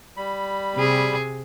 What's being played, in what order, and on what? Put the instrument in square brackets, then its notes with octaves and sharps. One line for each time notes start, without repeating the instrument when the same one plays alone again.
[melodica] G3 B5
[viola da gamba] C3 G#4